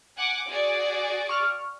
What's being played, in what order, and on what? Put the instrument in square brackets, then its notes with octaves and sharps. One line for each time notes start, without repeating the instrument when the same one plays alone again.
[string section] F#5 G#5 D6
F#4 G#4 D5
[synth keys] C#6 F6